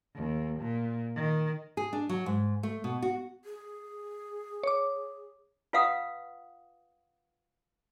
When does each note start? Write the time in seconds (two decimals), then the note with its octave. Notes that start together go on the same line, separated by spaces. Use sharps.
0.16 D#2
0.60 A#2
1.16 D#3
1.77 G#4
1.93 D4
2.09 F#3
2.26 G#2
2.63 A3
2.84 B2
3.02 F#4
3.45 G#4
4.63 C#5 D6
5.73 F4 B4 F5 F#5 D#6